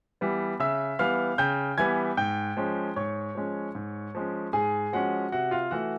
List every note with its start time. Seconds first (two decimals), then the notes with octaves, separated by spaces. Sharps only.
0.21 E3 G3 B3
0.59 C#3 E5 E6
0.99 E3 G3 B3 F5 F6
1.38 C#3 G5 G6
1.77 E3 G3 B3 G#5 G#6
2.17 G#2 G5 G6
2.57 F3 G#3 C#4
2.96 G#2 C#5 C#6
3.35 F3 G#3 C#4
3.75 G#2
4.15 F3 G#3 C#4
4.53 G#2 G#4 G#5
4.93 F3 G#3 C#4 F#4 F#5
5.32 C3 F#4 F#5
5.51 F4 F5
5.71 E3 A3 F#4 F#5